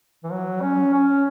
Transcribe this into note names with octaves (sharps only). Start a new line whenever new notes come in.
E3
F#3
C#4
C#4